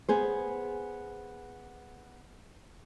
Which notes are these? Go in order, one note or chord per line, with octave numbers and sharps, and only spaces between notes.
B3 G#4 C5